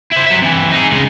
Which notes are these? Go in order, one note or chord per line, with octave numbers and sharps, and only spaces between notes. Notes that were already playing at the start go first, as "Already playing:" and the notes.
E4 C5
F#3 E5
C3 E3
D#4 G#4
C#3 G#3